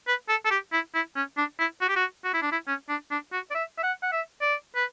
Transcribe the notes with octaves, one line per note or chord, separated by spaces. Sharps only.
B4
A4
A4
G4
E4
E4
C#4
D4
E4
F#4
G4
F#4
F#4
E4
D4
E4
C#4
D4
D4
F#4
D5
E5
E5
F#5
F#5
E5
D5
B4